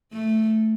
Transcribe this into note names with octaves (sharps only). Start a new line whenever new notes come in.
A3